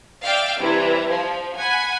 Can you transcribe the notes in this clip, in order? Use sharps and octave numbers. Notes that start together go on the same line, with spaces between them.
D5 E5 F5 G5
C3 E3 G3 E4
F3
F#5 G#5 B5